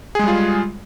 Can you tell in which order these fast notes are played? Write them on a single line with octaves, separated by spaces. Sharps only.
G#4 G#3 G3 F4